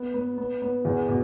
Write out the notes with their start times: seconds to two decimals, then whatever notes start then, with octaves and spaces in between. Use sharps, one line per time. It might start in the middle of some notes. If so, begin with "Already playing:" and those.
Already playing: B3
0.14 B3
0.38 B3
0.62 B3
0.85 E2
1.09 B2